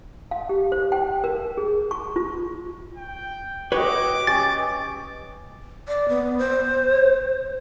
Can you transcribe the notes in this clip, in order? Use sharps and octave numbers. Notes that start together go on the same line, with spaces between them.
F5
G4
C5
G5
A#4
G#4
C#6
F4
G5
F#4 G4 B4 C#5 D#5 D6
C#4 G4 A6
D5
B3
C5